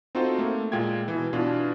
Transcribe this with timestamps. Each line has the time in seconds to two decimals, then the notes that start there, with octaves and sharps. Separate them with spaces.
0.15 C4 D#4 F4 F#4 A4 C5
0.38 A3 A#3
0.72 A#2 G#3 F4 G5 G#6
1.08 B2 E3
1.33 B2 E3 D4 F4